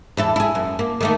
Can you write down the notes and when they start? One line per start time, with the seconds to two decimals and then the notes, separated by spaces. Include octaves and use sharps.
0.17 E2 E4 A4
0.36 E4 G#4
0.55 F#2
0.79 A#3
1.01 D#3 A3 A#3